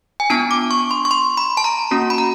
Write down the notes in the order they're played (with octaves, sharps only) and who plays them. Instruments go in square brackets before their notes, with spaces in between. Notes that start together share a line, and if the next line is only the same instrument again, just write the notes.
[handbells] G#5
B3 D4 F4 A5
D6
C#6
C6
C#6
C6
B5
A5
A#5
A#3 C#4 F#4 A#5
B5
A#5